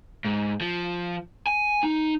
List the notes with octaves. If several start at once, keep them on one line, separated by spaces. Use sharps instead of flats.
G#2
F3
G#5
D#4